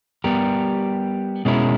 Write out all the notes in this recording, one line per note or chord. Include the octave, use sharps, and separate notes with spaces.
G3 B3 G4 A#4
B2 G#3 C#4 E4 A#4